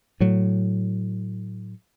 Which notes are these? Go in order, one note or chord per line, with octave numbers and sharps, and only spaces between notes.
A2 F#3